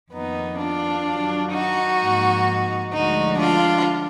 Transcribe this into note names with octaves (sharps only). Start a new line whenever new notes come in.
F2 D#3 A#3 B3 D#4
D4 F4
F#2 D#3 F#3
D#4 F#4
G#2 F3 A#3
D2 D3 F3 G#3 D#4 F#4
D4 F4